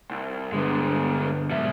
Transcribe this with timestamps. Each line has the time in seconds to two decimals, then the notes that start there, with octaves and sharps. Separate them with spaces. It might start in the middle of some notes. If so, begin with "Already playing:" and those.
0.11 C2
0.52 G2 D3 G#3 B3
1.50 G#2 B2 F#3 G3 E5